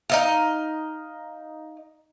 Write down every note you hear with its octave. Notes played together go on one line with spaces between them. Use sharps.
D#4 D#5 F5